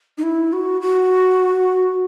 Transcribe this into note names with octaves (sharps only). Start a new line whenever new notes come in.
D#4
E4
F#4
F#4